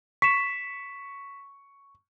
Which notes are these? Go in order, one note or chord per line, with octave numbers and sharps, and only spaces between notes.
C#6 B6 E7